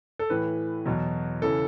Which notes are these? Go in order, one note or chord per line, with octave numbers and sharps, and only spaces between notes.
A4
A2 E3 B4
E2 B2 F#3
C#3 E3 A4